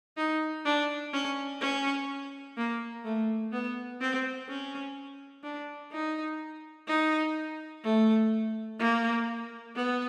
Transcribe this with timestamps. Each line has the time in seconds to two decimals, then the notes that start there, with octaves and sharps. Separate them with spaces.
0.17 D#4
0.65 D4
1.13 C#4
1.61 C#4
2.57 A#3
3.04 A3
3.52 B3
4.00 C4
4.49 C#4
5.44 D4
5.92 D#4
6.87 D#4
7.84 A3
8.80 A#3
9.76 B3